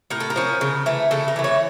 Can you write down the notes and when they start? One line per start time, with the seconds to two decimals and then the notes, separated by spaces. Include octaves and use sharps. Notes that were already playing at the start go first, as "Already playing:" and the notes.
0.10 A2 A#4
0.20 A4
0.30 A#4
0.36 F3 C#4
0.61 C#3
0.86 E3 A3
1.11 C#3 A4
1.28 A#4
1.36 E3 A3
1.44 C#5